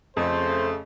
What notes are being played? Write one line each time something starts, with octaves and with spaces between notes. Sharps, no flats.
F2 C#3 A3 C5